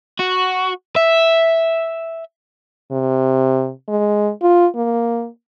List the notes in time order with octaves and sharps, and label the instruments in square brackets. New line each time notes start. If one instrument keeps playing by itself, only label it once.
[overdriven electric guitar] F#4
E5
[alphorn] C3
G#3
F4
A#3